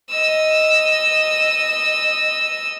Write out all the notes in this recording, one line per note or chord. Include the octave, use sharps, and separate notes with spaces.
D#5 E6